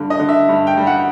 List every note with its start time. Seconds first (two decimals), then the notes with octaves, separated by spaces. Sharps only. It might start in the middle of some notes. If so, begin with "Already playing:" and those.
Already playing: G2 D3
0.10 D#5
0.19 D3
0.29 E5
0.49 G2
0.67 G5
0.77 G3
0.87 F#5